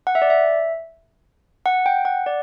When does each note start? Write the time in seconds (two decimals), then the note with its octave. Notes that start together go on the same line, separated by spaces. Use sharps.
0.07 F#5
0.15 E5
0.22 D5
0.30 E5
1.66 F#5
1.86 G5
2.05 F#5
2.26 D5